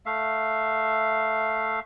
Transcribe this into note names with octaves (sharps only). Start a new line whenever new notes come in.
A3 E5 F5